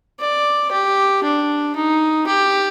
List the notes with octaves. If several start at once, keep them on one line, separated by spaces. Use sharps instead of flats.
D5
G4
D4
D#4
G4